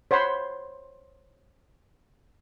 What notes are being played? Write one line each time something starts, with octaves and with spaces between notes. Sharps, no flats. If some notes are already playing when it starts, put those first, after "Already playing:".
C5 C#5 F#5 B5 C6